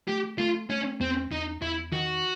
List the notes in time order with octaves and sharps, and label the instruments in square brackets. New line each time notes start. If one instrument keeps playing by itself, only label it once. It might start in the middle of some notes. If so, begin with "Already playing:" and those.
[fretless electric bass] A3 [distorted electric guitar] G4
[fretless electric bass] A3 [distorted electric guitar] F4
[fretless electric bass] A3 [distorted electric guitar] C#4
[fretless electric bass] E2 [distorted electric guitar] C4
[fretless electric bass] E2 [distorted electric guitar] D#4
[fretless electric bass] E2 [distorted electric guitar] E4
[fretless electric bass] D#3 [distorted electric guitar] F#4